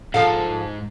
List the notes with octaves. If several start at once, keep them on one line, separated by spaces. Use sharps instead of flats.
G#2 F3 A4 F5